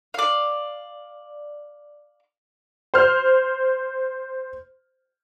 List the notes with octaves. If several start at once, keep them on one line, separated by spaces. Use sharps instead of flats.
D5 F5
C5 F6